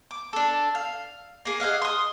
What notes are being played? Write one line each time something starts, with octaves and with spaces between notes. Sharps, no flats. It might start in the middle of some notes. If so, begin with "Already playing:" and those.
D6
D4 A4
F5
A#3 G#4
G#4 D#5 F5 F#5
C6 D#6